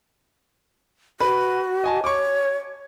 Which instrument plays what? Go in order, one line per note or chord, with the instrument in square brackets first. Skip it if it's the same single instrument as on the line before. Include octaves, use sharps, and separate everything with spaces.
[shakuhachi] F#4 [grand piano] B4
[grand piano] D#5 G#5 A5
[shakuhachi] C#5 [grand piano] C#6 D6